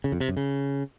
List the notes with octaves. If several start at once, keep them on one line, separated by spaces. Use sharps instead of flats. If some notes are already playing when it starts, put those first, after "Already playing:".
C#3
F2
C3
F#2
C#3